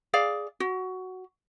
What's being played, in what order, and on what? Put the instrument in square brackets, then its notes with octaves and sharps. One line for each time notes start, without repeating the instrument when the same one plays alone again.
[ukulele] G#4 D5 F5
F#4